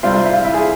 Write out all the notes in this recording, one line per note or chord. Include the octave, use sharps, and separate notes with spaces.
C3 G3 C4 F4
F4
E4
F4
E4
G#4